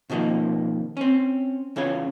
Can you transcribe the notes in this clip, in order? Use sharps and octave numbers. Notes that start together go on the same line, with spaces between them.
B2 D#3 F3 G3 A#3
C4 C#4
E2 C#3 F4 C#5